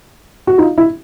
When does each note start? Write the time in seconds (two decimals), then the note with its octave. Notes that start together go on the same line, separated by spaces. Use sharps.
0.47 F#4
0.58 D#4 F4
0.78 E4